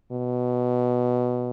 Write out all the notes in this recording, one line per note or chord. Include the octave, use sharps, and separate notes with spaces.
B2